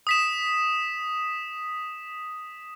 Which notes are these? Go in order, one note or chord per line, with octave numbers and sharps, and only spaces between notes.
D#6 B6 E7